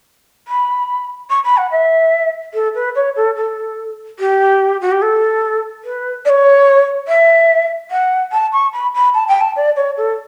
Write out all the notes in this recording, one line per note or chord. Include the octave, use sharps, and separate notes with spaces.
B5
C#6
B5
F#5
E5
A4
B4
C#5
A4
A4
G4
F#4
G4
A4
B4
D5
C#5
E5
F#5
A5
C#6
B5
B5
A5
G5
A5
D5
C#5
A4